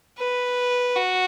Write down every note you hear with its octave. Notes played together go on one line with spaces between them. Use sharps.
B4
F#4